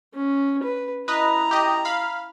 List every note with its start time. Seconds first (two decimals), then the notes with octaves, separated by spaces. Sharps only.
0.14 C#4
0.63 B4
1.08 E4 B4 D#5 A#5
1.51 G4 D#5
1.85 F5 B5